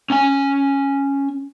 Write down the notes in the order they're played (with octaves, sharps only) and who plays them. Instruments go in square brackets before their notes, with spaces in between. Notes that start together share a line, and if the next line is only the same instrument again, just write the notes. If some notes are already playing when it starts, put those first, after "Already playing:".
[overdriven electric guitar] C#4 G#5